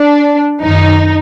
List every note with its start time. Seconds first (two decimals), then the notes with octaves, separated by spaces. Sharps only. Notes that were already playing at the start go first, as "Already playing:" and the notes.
Already playing: D4
0.61 F#2 D#3 D#4